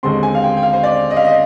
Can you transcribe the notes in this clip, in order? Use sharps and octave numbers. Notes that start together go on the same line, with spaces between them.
D#2 D3 G#3 C4 C6
G#5
F5
G5
G5
F5
C5
D5
D#5
F5
D#5